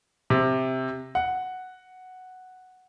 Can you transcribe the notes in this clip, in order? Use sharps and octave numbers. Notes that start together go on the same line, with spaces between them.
C3
F#5